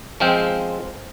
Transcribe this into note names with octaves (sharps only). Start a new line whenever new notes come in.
F3 G#3 C4 F5 G5